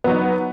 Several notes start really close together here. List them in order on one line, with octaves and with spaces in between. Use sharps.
B3 F#3 D#4